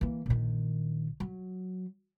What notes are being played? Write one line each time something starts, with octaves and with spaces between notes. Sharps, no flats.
E3 A#3
A#1 D#3
F#3